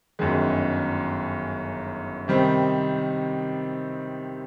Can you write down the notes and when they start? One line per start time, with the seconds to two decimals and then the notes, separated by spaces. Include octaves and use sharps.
0.19 G1 F#2 D#3 G#3
2.28 C3 D#3 G3 C4 D#4